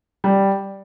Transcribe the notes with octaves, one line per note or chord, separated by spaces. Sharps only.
G3